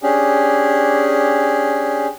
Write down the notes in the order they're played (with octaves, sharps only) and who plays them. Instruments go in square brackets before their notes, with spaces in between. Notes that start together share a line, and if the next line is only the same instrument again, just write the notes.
[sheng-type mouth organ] C#4 D4 G4 G#4